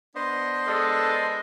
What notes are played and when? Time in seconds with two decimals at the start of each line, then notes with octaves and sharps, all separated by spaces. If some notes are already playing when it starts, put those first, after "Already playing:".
0.16 B3 D4 C5 D#5 C6
0.67 G#3 A4